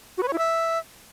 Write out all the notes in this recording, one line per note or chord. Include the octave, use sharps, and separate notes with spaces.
F#4
B4
C#5
E4
E5